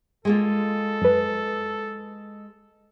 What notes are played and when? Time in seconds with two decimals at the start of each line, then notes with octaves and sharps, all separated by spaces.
0.25 G#3 A#3 F4 A4
1.01 F#2 B4